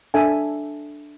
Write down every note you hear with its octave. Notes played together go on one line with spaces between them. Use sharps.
D4 A4 E5 G#5